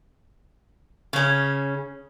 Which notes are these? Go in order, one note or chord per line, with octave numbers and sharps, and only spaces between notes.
C#3 C#4